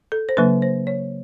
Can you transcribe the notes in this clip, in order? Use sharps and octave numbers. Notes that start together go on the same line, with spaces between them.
A4
C5
C#3 F#3 A#3 D4 B4
C5
C#5